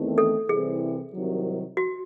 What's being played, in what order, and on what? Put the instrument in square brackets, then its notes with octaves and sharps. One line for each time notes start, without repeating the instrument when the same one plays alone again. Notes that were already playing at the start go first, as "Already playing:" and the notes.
Already playing: [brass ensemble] E2 D#3 A3 C4
[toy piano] A4
[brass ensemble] C2 C3 E3 C4 [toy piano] G#4
[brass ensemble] C2 C3 D#3 F#3
[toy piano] F#4